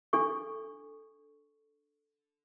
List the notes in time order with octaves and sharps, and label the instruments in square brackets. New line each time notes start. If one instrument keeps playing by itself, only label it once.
[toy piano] D4 A4 C#6